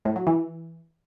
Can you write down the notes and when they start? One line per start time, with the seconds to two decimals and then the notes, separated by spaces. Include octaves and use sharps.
0.05 A2
0.16 F#3
0.27 E3